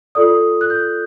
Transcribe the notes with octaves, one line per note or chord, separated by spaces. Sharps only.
F4 A4 D5 D#6
F#6
G6